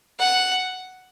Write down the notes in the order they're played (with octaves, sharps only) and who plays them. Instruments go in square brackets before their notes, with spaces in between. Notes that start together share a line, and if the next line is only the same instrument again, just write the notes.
[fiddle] F#5